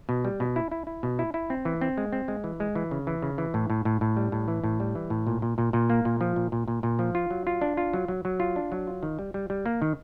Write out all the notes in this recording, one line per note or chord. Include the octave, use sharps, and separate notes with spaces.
B2
G3
B2
E4
E4
E4
B2
E4
E4
C4
E3
C4
G#3
C4
G#3
E3
G#3
E3
C#3
E3
C#3
E3
A2
A2
A2
A2
G3
A2
E3
A2
G3
E3
A2
A#2
A#2
A#2
A#2
A#3
A#2
F3
A#2
A#2
A#2
A#2
F3
F4
F#3
F4
D4
F4
F#3
F#3
F#3
F4
D4
F#3
F4
D#3
G3
G3
G3
A#3
D#3